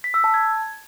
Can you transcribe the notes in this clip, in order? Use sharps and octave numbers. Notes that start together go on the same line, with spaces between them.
B6
E6
A5
G#6